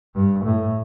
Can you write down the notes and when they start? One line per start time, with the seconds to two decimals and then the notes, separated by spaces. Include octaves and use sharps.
0.15 G2
0.45 A2